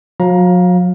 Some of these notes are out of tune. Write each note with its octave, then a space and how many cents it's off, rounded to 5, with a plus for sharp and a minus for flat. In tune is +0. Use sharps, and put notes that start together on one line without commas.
F#3 -40 F5 +15 A#5 +25